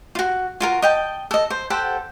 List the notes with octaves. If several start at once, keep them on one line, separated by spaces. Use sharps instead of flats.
F4 F#4
F4 F#4 A#4
D#5 G5 A5
A4 D#5
C5
G4 A4 C5 F#5